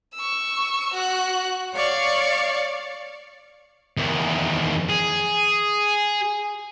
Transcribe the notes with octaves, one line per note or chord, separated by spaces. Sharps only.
C#6 E6
F#4 F#6
C#5 D5 F5 C#6
E2 D#3
G#4